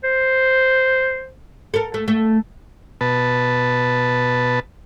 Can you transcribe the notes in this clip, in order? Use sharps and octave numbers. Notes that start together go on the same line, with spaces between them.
C5
A4 A#4
A3
A3
B2 B4 A5